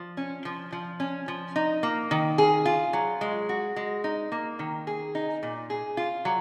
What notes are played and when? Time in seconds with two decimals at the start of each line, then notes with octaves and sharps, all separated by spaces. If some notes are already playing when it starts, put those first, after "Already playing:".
Already playing: F3
0.17 C#4
0.45 F3
0.72 F3
1.00 C#4
1.28 F3
1.56 D#4
1.83 A#3
2.11 D#3
2.38 G#4
2.66 F4
2.93 F#3
3.21 G#3
3.49 F#4
3.76 G#3
4.04 D#4
4.32 A#3
4.59 D#3
4.87 G#4
5.15 D#4
5.43 A#2
5.70 G#4
5.97 F4
6.25 F#3